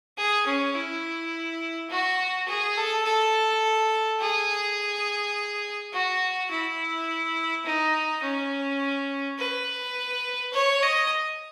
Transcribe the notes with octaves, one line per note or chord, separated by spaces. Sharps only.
G#4
C#4
E4
F#4
G#4
A4
A4
G#4
F#4
E4
D#4
C#4
B4
C#5
D#5